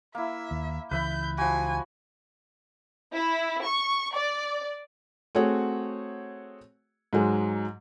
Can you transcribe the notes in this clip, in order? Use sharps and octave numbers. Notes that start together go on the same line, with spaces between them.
A#3 E4 E5
D#2
C#2 E3 B4 E5 B5 G6
F3 F#4 G#5
E4
C#6
D5
A3 C4 F#4 G#4 C#5 F#5
G#2 F#3 G#3